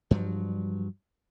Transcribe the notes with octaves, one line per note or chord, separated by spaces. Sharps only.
G2 F3 F#3